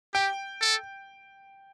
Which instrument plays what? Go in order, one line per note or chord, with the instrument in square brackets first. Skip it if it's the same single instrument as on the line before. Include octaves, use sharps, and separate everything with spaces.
[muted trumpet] G4 [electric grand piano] G5
[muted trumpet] A4